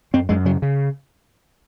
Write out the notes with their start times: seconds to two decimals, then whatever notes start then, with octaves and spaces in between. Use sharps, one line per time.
0.14 F#2 C4
0.29 F#2 G#3
0.45 C#3 F#3
0.62 C#3